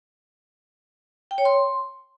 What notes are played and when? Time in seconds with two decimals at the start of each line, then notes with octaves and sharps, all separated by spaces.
1.31 G5
1.38 C#5
1.45 C6